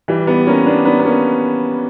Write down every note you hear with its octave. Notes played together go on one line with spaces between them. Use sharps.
E3 G3
G3 B3
A#3 C#4
B3 D4
B3 D4
B3
A#3 C#4